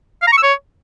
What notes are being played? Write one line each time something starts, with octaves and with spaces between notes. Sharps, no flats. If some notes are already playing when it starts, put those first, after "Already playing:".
F5
A#5
C#6
E6
C#5